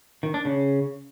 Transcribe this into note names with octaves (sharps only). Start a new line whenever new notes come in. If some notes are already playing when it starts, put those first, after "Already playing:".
D#3
D4
C#3